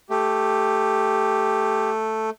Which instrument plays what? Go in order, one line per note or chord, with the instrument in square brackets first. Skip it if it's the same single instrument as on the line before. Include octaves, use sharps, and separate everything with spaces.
[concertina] A3 [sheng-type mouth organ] G4